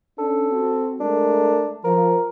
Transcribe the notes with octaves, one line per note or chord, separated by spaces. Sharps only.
C#4 D4 A4
C4 F#4
G#3 A3 D4 A#4
F3 A#4